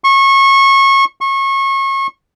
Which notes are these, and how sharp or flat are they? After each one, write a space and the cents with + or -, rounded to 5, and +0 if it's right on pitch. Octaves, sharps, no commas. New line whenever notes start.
C#6 -25
C#6 -30